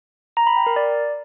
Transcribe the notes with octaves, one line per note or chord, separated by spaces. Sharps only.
A#5
B5
G5
A#4
D5